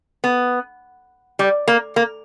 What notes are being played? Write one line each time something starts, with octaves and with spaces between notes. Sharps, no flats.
B3
G3
A#3
A#3